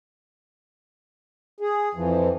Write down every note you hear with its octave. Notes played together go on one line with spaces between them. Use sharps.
G#4
F2 E3 F3